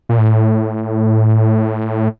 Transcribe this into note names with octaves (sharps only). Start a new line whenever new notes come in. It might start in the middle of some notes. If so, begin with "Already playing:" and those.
A#2
A2